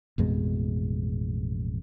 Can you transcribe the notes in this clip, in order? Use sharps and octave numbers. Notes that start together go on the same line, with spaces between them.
A1 F2 B2 G#3